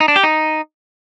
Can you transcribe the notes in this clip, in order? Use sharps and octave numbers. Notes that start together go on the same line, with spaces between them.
D#4
D4
G4
D#4